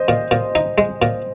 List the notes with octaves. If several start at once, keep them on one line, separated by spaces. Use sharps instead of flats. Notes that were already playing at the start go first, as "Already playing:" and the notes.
Already playing: C5 D#5
A#2
A#2
D#4
G#3
A#2